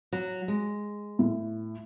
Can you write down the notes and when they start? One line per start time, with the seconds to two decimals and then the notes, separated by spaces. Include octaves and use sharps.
0.13 F#3
0.48 G#3
1.19 A2